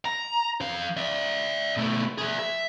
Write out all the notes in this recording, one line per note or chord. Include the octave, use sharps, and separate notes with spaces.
A#5
F2 F5
D5 E5
B2 A3
G#4 E5
E5